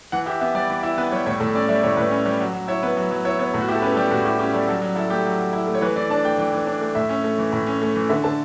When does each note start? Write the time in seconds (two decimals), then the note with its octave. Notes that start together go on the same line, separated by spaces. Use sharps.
0.12 E3 F#5
0.26 E4 G4
0.41 B3 E5
0.55 G3 D5
0.70 E3
0.83 E4
0.98 B3 B4
1.11 G3 C#5
1.26 A2 C#5
1.40 A2 A4
1.55 C#4 D5
1.69 G3 E5
1.83 A2 C#5
1.97 A2 B4
2.11 C#4
2.26 G3
2.41 F#3
2.54 F#3
2.68 E4 C#5
2.83 B3 B4
2.97 F#3
3.11 F#3
3.25 E4 C#5
3.39 B3 C#5
3.54 A2
3.61 F#4
3.68 E4 G4
3.75 A4
3.82 C#4 B4
3.92 A4
3.96 G3 G4
4.11 A2 F#4
4.25 E4 G4
4.39 C#4 G4
4.54 G3 A4
4.68 F#3 A4
4.82 F#3
4.96 E4 A4
5.10 A3 G4
5.25 F#3
5.39 F#3
5.53 E4
5.67 A3
5.75 C#5
5.81 E3 B4
5.96 E3 D5
6.10 D4 A5
6.25 A3 G5
6.38 E3 G5
6.53 E3
6.67 D4
6.81 A3
6.95 A2 E5
7.09 C#4
7.24 A3
7.38 E3
7.53 A2
7.67 C#4
7.82 A3
7.96 E3
8.09 D3 E5
8.24 D3 A5